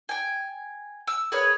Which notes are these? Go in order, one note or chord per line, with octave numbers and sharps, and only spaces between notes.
G5 G#5
E6
G#4 A#4 B4 C#5